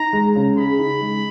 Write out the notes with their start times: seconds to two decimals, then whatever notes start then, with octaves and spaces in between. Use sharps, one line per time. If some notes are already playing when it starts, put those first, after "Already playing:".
Already playing: D#4 A#5
0.13 G#3
0.36 C#3
0.57 G#4 B5
0.79 D#4
1.01 G#3